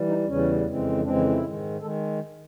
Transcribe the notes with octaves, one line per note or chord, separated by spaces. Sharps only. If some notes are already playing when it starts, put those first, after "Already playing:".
Already playing: E3 G3
D#4
E2 C#3 E3 G3 C#4
F2 C#3 E3 G#3 C4
F2 C#3 E3 G#3 C4 D4
E4
E4
G#2 D#3 G#3
D#3 G#3 A4